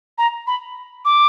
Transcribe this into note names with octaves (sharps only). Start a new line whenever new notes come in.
A#5
B5
D6